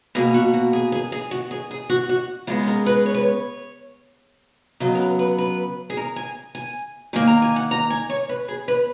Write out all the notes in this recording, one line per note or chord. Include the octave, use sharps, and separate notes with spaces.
B2 A#3 G#4
F#4
F#4
G#4
G#4
G#4
F#4
G#4
G#4
F#4
F#4
C#3 G#3 B3 F4
A#4
B4
C#5
B4
C#5
C#3 F#3 B3 D#5
A#4
B4
B4
B4
G#4
A#4
G#5
G#5
D#3 A#3 G#5
A#5
G#5
F#5
A#5
G#5
C#5
B4
G#4
B4